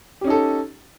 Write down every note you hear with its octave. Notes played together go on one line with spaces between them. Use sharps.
C#4 D#4 G4 A4